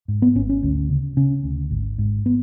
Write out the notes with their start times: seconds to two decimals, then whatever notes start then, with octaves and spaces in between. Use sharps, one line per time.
0.08 G#2
0.22 B3
0.35 G#1 C#4
0.49 C#4
0.63 D2
0.90 C#3
1.17 C#3 C#4
1.44 D2
1.71 G#1
1.98 G#2
2.26 B3